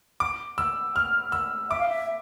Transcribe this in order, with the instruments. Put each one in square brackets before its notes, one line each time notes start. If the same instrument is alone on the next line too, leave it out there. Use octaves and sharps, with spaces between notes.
[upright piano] D6
E6
F6
E6
[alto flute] E5 [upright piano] D6
[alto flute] F5
E5